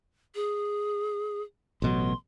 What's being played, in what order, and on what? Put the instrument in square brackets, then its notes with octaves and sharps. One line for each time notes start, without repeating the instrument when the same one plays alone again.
[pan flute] G#4
[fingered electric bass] A1 B2 F#3 [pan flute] C6